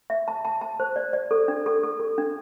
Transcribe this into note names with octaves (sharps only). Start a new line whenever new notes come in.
E5
A5
A5
A5
C5
D5
D5
A4
D4
A4
A4
A4
D4